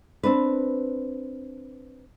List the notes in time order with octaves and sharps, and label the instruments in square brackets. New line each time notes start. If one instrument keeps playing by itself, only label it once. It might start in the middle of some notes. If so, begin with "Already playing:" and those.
[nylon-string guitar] C4 D4 B4